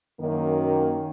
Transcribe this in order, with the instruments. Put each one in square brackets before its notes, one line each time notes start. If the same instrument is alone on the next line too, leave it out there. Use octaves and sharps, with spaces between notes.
[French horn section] F#2 D#3 A#3